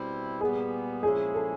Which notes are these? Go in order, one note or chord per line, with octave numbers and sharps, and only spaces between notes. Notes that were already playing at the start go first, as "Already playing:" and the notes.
Already playing: B2 G3 C4 E4
A#2 G3 B3 G#4
A#2 F3 G#3 C#4 E4 G#4
A4